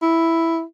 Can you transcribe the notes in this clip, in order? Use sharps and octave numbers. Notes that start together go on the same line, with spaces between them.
E4